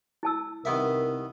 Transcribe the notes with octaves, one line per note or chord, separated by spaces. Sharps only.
E4 A5 E6
C2 D#3 B3 A#4 E5